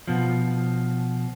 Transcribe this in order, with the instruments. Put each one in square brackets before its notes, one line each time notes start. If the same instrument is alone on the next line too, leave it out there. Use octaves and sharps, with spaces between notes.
[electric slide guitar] B2 F3